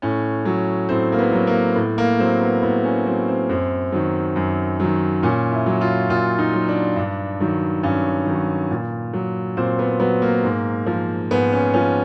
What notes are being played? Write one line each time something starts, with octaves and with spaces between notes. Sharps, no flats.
A2 C#4
F#3
A2 C4
A#3
B3
F#3
A#3
A2 B3
A#3
F#3 C4
B3
A2 B3
C#4
F#3 C4
C4
F#2 C4
D#3 F#3
F#2
D#3 F#3
A#2 C#4
E4
F#3
F4
A#2 F4
D#4
F#3
D4
G2
D#3 F#3
G2 C#4
D#3 F#3
A#2
F#3
A#2 C4
B3
F#3 B3
A#3
G#2
F3
G#2 B3
C#4
F3 C#4